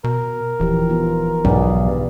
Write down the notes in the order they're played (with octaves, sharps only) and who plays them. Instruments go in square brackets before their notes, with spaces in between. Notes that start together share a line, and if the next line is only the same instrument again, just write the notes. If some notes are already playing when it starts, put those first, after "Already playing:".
[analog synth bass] B2 [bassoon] A#4
[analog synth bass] D#1 [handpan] E3 F3 G4
[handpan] B3 D#4 F4
[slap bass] B1 [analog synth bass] G#2 [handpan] G#4 B4 D5
[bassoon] G2